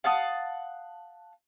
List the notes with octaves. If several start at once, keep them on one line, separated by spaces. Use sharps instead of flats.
F5 F#5 A5 D#6